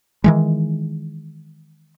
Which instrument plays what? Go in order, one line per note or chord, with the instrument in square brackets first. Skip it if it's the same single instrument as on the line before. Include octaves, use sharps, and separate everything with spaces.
[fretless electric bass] D#3 E3 G#3